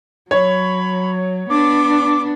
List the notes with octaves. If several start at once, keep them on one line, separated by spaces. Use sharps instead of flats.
F#3 C#5 B5
B3 D4 D6